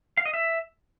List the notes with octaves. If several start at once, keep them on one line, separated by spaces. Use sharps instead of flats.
F5
D#5
E5